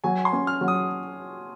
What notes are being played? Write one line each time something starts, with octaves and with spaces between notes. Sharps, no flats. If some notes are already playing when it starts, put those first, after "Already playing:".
F#3 G#5
C6
C#4
F6
F#3
D#6